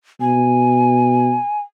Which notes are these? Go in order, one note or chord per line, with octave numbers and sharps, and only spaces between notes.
B2 G#5